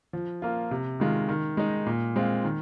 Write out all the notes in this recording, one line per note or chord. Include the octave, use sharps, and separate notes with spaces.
F3
A#3 F4
C3
D#3 G#3 F4
D#3
G#3 D#4
A#2
G#3 C4 F4
D#3